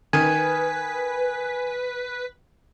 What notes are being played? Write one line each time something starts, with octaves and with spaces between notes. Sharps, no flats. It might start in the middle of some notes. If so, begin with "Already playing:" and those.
D#3 B4 G#5